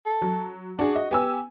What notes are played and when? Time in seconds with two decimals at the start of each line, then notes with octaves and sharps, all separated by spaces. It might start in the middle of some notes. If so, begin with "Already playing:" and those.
0.06 A4
0.22 F#3
0.79 D4 F#4 G#4
0.96 D#5
1.11 B3 G4 G#5 E6